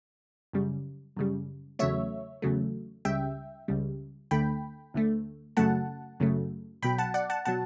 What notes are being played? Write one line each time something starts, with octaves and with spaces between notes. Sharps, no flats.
F#2 C#3 G3
F#2 C#3 G3
E2 C#3 F#3 A3 C#5 E5
E2 C#3 F#3 A3
C#2 C#3 G3 E5 G5
C#2 C#3 G3
D2 D3 A3 G5 B5
D2 D3 A3
F#2 C#3 F#3 A3 F#5 A5
F#2 C#3 F#3 A3
B1 B2 F#3 G5 B5
F#5 A5
D5 F#5
F#5 A5
B2 F#3 F#5 A5